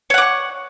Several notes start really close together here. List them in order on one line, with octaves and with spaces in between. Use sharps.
C#5 F#5 D6 C#6